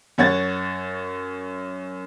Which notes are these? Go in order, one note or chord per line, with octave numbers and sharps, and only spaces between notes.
F#2 C#5 F#5 G#6 A6